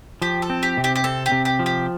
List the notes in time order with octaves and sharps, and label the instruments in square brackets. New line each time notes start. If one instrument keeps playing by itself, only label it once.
[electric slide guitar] F3 [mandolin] G4
[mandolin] A4
[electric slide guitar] C4
[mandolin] G4
[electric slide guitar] C3
[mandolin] G4
G4
[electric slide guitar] C4 [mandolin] A4
[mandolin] G4
[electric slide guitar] C3
[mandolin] G4
[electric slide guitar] F3
[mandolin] G4